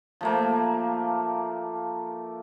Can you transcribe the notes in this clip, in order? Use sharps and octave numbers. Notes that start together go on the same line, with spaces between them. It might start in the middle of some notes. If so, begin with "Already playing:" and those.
F3 A3 A#3